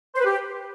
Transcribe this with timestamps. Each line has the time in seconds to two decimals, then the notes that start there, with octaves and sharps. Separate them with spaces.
0.15 C5
0.20 B4
0.25 G4